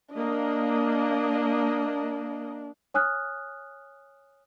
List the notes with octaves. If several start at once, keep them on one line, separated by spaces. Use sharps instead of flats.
A#3 D4 D#5
C#5 G#5 D#6 F6 F#6